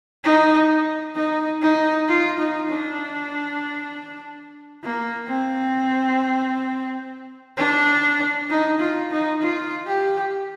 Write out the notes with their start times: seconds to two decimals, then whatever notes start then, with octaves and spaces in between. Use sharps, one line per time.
0.24 D#4
1.15 D#4
1.62 D#4
2.08 F4
2.39 D#4
2.69 D4
4.83 A#3
5.28 C4
7.58 D4
8.50 D#4
8.80 F4
9.11 D#4
9.41 F4
9.87 G4